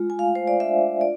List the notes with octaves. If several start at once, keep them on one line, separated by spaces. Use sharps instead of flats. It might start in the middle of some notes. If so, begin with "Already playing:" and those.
Already playing: G#3 F4
G#5
A3 F5
C5
D5
D4 E5
F4 D5